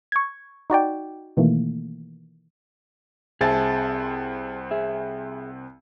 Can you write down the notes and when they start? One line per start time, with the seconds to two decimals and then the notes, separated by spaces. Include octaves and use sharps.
0.12 C#6 G#6
0.70 D#4 F#4 D5 G5
1.37 B2 D#3 E3 A3 A#3
3.41 C2 C4 G#4 E5 A5 A6
4.71 G#4 E5